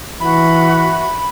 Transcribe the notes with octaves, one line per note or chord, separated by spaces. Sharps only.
E3 F#4 E5 B5